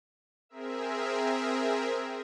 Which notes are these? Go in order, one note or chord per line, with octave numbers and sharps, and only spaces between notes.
C4 G#4 A#4 E5